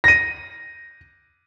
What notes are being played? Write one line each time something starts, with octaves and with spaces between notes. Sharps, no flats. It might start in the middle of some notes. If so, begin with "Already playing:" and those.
A#6 D#7